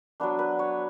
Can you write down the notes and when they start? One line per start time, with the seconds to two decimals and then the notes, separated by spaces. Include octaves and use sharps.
0.20 F#3 B3 D4
0.39 B4
0.59 C#5